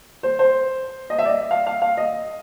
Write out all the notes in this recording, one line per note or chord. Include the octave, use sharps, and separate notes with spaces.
C5
C5
D#5
E5
D5
D#5
F5
F5
F5
D#5